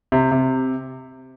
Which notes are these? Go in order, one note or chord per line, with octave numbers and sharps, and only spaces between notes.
C3
C3